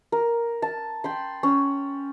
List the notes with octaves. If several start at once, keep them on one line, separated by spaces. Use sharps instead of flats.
A#4
A5
G5 B5 C6
C#4